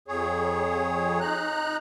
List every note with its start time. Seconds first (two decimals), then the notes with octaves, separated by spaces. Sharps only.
0.08 F2 G#4 C#5
1.20 D#4 A#5 F#6